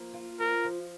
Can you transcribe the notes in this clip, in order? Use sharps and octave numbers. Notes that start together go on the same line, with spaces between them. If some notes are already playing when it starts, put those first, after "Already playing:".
Already playing: F3 A#3
F4
F3 A#4
F3